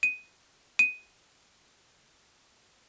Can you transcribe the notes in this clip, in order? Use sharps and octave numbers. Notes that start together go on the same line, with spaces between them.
D#7
D#7